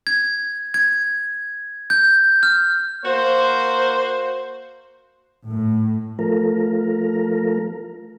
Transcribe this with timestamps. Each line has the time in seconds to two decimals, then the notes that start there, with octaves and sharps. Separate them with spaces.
0.07 G#6
0.74 G#6
1.90 G6
2.43 F6
3.05 A#3 F#4 C5
5.48 A2
6.19 F3 A3 A#4